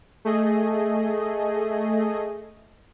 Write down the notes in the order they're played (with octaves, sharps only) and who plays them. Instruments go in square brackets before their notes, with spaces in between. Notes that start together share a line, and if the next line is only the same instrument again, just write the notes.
[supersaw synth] A3 G#4 D#5